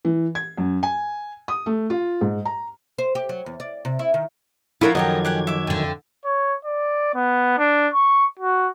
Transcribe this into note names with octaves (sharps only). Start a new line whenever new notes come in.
E3
G#6
F#2
G#5
D#6
A3
F4
G#2
A#5
C5
G4
F#3
E2
D5
C3
E4
D#3
F3 D4 E4 F4 A4 A#4 C#5 F#5
F#2 D#3 G4 C#5 D#5 G#6
G4 F#5 G#5
E5 D6
F2 D3
C#5
D5
B3
D4
C#6
F#4